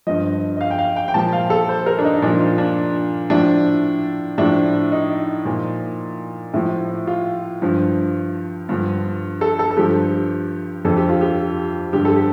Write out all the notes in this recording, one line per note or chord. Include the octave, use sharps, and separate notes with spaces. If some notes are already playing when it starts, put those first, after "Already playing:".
G2 F3 D#5
D#5
F5
G5
F5
G5
G5
A#2 F3 A5
F5
A4
C5
A#4
D4
D#4
A#2 F3 D4
F4
D4
A2 F3 D4
A2 F3 D4
D#4
A#2 F3
A2 F3
F4
G2 F3
G2 D3 F3
A4
A4
A4
G2 F3 G4
F2 D3 F3 A4
G4
F4
G4
G2 D3 F3 G4
A4
G4